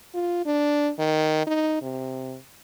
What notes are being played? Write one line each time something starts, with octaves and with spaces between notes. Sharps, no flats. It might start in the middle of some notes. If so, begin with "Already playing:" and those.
F4
D4
D#3
D#4
C3